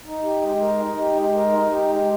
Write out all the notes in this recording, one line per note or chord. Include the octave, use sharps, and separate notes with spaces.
D#4
G4
G#3
A#4
D#4
G4
G#3
A#4
D#4
G4
G#3